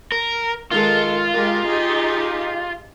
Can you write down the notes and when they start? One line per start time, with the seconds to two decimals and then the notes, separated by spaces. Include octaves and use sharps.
0.12 A#4
0.71 D#3 G#3 F4 A4
1.33 G#3 G4 A#4
1.68 D#4 G4 G#4